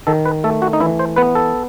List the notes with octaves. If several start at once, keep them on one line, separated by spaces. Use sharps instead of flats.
D#3 A4
B4
A3 A4
F#4
D#4
E3 E4
C5
B3 B4
A4